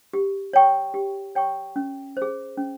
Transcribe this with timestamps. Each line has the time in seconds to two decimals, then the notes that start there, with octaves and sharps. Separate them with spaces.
0.13 G4
0.53 C#5 G5 C#6
0.94 G4
1.35 C#5 G5 C#6
1.76 C#4
2.17 C5
2.22 G#4
2.57 C#4